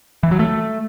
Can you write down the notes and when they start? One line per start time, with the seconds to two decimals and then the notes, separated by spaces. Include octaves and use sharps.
0.23 E3
0.31 F#3
0.39 A3